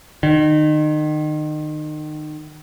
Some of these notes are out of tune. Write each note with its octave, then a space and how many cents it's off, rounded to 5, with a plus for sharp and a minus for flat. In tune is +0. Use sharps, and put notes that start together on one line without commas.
D#3 -30